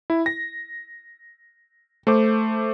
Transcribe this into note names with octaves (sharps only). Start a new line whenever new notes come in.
E4
A#6
A3 C5 D6